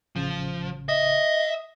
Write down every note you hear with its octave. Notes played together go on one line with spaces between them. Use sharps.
A1 C#3 F3
D#5 E5